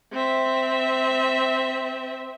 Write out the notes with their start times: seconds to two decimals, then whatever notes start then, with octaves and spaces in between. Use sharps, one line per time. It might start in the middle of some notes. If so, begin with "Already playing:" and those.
0.13 C4 E5